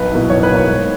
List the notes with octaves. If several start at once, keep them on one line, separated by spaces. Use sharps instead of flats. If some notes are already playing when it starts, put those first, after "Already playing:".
Already playing: B1 B4
B2 A#3 E4
B1 C#5
B4
B2 A#3 E4
C#5
G#2